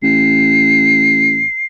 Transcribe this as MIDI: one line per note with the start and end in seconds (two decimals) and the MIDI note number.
0.03 1.44 33
0.03 1.66 96